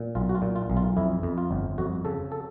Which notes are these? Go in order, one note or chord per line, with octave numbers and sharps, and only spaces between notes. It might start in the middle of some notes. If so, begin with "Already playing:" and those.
Already playing: A#2
B1 F4
F#4
F4
A#2
F4
B1
F4
F2 E4
F2
F4
G1
F2 F#4
C#3 A4
A4